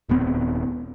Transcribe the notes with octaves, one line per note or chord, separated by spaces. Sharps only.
D#1 D#2 B3 C4